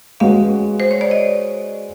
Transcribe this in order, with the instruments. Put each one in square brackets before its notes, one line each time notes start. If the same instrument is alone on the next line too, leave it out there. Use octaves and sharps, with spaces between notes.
[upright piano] G#3 C#4 F#4 B4 [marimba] F5
[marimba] C5
C#5
D5
D#5